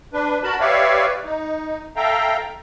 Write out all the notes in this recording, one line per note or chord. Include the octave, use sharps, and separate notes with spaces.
D4 B4
F#4 A#4 A5 B5
G4 B4 C#5 D5 E5 F5
D#4
A4 E5 F5 G5 A#5